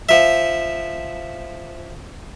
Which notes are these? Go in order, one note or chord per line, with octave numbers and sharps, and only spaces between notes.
F3 E5